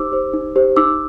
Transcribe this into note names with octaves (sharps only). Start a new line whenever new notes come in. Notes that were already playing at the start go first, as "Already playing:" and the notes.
Already playing: D#4 G4 C5 D6 E6
G4 C5
D#4
G4 C5
D#4 D6 E6